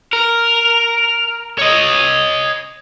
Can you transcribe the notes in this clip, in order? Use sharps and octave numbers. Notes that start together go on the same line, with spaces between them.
A#4
C#5 D#5